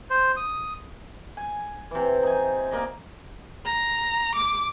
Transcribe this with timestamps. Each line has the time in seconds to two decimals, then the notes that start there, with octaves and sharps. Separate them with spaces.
0.10 C5
0.36 D#6
1.37 G#5
1.91 C3 E3
2.23 D#4 G#5
2.71 A#3 D5 D#5
3.65 A#5
4.35 D6